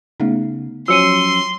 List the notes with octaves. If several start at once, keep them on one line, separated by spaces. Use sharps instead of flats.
C#3 A3 B3 D#4
F3 F#3 C#4 C6 E6 C#7 D#7